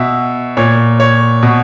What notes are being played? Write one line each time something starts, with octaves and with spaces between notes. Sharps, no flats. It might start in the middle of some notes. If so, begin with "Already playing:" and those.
Already playing: B2 E5
A#2 C#5
C#5
B2